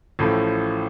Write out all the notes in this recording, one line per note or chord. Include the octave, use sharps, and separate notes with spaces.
A1 A2 F3 A3